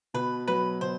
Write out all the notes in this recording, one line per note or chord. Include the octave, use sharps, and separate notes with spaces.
B2 B4
F#3 B4
B2 C5